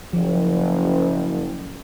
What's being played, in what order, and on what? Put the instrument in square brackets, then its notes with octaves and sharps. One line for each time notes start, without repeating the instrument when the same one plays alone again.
[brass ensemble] F#1 [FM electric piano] F3